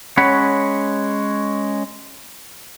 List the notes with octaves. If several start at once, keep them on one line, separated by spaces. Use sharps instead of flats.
G#3 C#4 C#5 F#5 B5